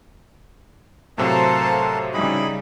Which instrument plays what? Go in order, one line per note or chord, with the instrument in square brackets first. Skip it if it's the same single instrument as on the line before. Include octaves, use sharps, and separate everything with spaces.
[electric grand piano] A2 C3 F#3 [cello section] A4 C5 F5 [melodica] A#4 A5
[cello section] C#3 G3 D#4 [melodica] E4 G#4 B5